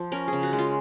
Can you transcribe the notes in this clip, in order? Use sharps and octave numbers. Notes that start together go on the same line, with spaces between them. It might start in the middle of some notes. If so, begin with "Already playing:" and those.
Already playing: F3
C#4 A#4
G#4
C#3
F#4
G#3
F4